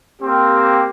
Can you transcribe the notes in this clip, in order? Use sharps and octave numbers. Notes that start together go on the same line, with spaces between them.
A#3 C4 G4